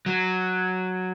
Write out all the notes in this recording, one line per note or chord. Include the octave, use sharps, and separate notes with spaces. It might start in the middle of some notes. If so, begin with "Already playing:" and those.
F#3